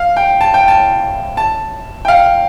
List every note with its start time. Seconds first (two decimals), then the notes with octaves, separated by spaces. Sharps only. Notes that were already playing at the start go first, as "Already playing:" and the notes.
Already playing: F5
0.17 G5
0.41 A5
0.54 G5
0.68 A5
1.37 A5
2.05 G5
2.08 F5